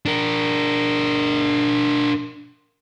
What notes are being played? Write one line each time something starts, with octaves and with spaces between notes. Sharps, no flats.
D4 A#4